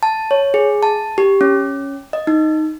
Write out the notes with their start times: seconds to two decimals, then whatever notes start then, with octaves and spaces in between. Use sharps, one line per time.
0.03 A5
0.31 C#5
0.54 G#4
0.83 A5
1.18 G4
1.41 C#4
2.13 D#5
2.27 D#4